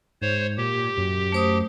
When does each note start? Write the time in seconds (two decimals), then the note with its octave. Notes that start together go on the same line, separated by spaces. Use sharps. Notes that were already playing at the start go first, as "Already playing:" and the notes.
0.22 G#2 C5 C#5
0.58 A#2 G4
0.97 F#2
1.32 A3 C5 D#6